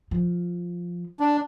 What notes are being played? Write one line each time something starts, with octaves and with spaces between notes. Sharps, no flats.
F3
D4